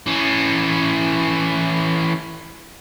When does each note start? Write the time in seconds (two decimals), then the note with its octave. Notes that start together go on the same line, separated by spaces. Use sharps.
0.06 E3 C#4